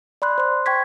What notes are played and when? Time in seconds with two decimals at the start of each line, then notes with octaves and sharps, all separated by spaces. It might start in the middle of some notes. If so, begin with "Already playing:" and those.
0.22 D5 B5 C6 F#6
0.38 C5 C6
0.66 G5 C#6 G#6 B6